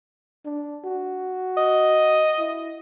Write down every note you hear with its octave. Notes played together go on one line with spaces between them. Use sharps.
D4
F#4
D#5
E4